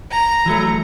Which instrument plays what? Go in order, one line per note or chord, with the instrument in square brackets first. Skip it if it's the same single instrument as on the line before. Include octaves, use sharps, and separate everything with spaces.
[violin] A#5
[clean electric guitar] E3 F#3 A3